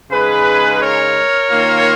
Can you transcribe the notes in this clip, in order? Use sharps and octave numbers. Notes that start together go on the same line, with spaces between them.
C#3 G#3 D#4 G#4 B4
A#4 C#5
D#3 A#3 F4